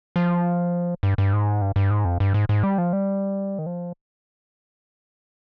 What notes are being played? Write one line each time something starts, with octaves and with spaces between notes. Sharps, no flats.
F3
G2
G2
G#2
G2
G2
G#2
F2
G2
G#2
G#2
G3
F3
G3
D#3
F3